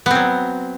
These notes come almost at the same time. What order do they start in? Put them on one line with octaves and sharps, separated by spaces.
B3 C4 F#3